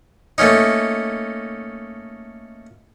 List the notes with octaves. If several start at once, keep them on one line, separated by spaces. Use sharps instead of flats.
A3 A#3 C#4 D#4